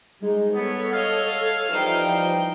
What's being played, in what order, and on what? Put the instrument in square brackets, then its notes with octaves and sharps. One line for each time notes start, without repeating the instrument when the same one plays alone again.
[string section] G3 G#3 D#4
[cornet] B3 [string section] A4 C#5
[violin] D#5 [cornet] F5
[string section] E3 F3 G3 [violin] D#4 G5